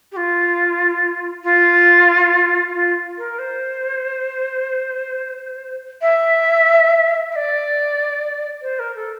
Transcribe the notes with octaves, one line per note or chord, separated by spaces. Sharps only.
G4
F4
F4
F4
A#4
C5
E5
E5
D5
C5
A#4
A4